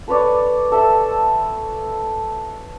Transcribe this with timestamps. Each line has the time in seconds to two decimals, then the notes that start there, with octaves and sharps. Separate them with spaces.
0.08 A4 B4 C#5 D5
0.72 A4 E5 A5